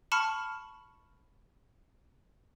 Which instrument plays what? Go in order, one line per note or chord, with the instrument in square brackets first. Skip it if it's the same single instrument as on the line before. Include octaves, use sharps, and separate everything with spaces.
[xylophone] A5 B5 C#6 F6 C#7